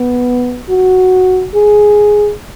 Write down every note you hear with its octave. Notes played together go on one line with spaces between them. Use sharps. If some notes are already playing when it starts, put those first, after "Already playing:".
Already playing: B3
F#4
G#4